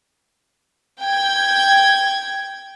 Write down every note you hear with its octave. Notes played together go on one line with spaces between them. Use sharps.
G5 G#6